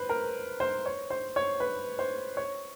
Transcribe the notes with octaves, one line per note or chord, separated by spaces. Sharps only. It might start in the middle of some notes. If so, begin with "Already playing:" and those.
Already playing: B4 C5
A#4
C5
C#5
C5
C#5
B4
C5
C#5